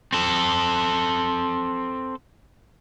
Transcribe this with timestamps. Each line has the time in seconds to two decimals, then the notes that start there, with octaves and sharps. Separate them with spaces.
0.13 C4 A4